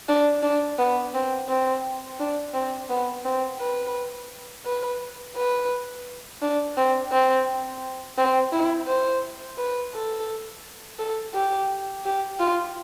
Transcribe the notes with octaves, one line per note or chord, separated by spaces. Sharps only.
D4
D4
B3
C4
C4
D4
C4
B3
C4
B4
B4
B4
D4
C4
C4
C4
E4
C5
B4
A4
A4
G4
G4
F4